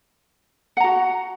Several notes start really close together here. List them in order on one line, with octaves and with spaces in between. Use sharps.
F#5 A#5 F#4